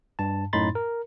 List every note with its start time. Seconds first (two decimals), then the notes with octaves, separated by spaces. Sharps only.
0.19 G2 A5
0.53 F#2 A2 D#4 B5 C6 A6
0.75 A#4